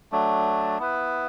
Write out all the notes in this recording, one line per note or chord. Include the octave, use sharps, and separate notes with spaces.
F#3 A3 D4
B3 E4 B4